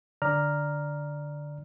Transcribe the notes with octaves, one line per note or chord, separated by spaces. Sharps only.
D3 D5 A#5 F6